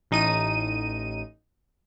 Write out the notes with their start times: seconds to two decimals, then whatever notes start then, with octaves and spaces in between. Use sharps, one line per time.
0.11 A1 D#4 D#7